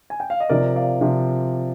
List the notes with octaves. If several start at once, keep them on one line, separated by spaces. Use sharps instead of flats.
G#5
G5
F5
D#5
C3 F3 A#4 D5
D5 F5
C3 F3